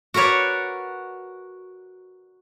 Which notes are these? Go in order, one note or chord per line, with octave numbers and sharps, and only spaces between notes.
F#4 A#4 B4 C#5 D5